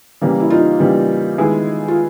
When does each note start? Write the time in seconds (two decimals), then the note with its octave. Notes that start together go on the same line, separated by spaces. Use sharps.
0.21 C#3 E3 G3 A#3
0.40 E4
0.50 D#4 F4
0.79 C#3 E3 G3 A#3
1.38 D#3 G#3 B3 E4 G#4
1.88 F4